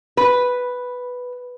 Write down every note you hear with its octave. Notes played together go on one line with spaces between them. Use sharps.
B4